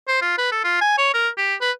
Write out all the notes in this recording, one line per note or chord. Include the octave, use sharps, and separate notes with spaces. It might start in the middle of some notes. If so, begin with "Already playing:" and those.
C5
F4
B4
A4
F4
G#5
C#5
A#4
G4
B4